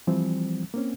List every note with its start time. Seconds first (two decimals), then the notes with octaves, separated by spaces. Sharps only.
0.07 E3 F3 G3 C4
0.74 A#3 C4 C#4